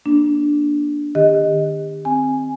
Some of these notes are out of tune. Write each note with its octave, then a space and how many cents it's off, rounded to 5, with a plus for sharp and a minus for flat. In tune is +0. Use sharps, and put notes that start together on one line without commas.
A#3 +30 D4 +0
D#3 -30 G4 +35 D#5 +0
C4 +0 G#5 +0